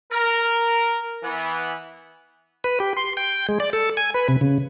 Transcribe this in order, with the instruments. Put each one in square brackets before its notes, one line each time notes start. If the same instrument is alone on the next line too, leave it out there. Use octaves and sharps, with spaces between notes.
[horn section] A#4
E3 B3
[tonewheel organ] B4
G4
C6
G5
G#3
D5
A4
G#5
B4
C3
C#3